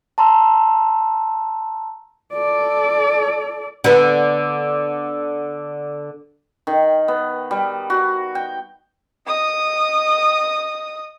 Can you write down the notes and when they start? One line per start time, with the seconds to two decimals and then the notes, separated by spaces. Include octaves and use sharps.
0.18 A5 A#5 C6 E6
2.34 A4 D5
3.84 D3 B3
6.67 D#3
7.08 B3
7.51 G3
7.90 F#4
8.35 G5
9.27 D#5 D#6